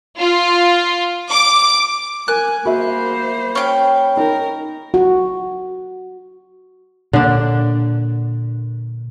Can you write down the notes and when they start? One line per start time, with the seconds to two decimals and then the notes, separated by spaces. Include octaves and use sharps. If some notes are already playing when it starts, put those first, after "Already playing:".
0.18 F4
1.32 D6
2.28 A#4 G#5 F#6
2.66 A#3 F#4 C5 E5 B5
3.55 C#4 G5
4.17 D#4 A#4
4.94 F#4
7.13 A#2 D3 A#3 D4